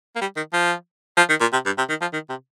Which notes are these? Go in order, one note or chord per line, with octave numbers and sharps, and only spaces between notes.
A#3
G3
D#3
F3
F3
D#3
A#2
C3
G2
C3
D#3
F3
D#3
C3